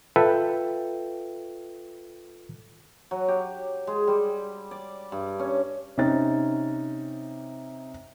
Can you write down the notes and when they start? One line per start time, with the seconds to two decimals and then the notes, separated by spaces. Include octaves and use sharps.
0.16 F4 A4 B4 E5 G5
3.11 F#3
3.28 G4
3.87 G#3
4.07 G3
4.71 D5
5.12 G2
5.39 C#4
5.97 C3 C#4 D#4 A6